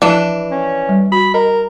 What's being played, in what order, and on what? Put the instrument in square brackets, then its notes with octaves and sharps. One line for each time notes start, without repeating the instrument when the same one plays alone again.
[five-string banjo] E3 D4 [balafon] F3
[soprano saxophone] C#4
[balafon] G3
[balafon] F#4 [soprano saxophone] B5
[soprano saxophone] A#4 [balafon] D#5 A#5 B5